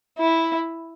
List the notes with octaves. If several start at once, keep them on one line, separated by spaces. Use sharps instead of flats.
E4